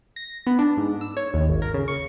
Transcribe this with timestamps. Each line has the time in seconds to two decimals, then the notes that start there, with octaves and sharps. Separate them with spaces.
0.16 A#6
0.47 B3
0.59 D4
0.77 G#2
1.01 E6
1.17 C#5
1.34 D#2
1.49 G#1
1.62 A#4
1.74 C#3
1.88 C#6